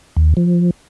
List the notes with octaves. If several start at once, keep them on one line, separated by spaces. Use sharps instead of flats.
D#2
F3